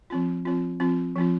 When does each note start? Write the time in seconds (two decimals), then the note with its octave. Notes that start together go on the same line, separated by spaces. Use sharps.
0.10 F3 C4 F4
0.45 F3 C4 F4
0.80 F3 C4 F4
1.16 F3 C4 F4